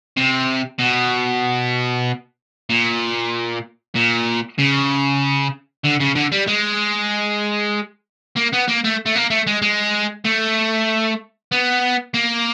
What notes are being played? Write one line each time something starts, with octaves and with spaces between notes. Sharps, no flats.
C3
B2
A#2
A#2
C#3
D3
C#3
D3
G3
G#3
A#3
B3
A#3
A3
A3
A#3
A3
G#3
G#3
A3
B3
A#3